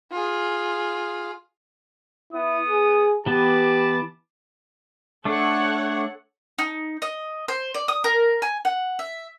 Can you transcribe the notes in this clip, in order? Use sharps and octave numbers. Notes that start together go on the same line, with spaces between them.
F4 G#4
B3 E4 D#6
G#4
E3 B3 G4 A5 B5 D6
A3 D4 A4 C#5 F#5
D#4
D#5
C5
D5
D#6
A#4
G#5
F#5
E5